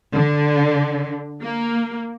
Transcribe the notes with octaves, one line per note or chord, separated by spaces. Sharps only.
D3
A#3